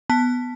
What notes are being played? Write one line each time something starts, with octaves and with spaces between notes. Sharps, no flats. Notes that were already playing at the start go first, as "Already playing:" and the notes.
B3 A5